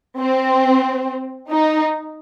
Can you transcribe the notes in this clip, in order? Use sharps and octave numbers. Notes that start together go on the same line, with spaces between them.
C4
D#4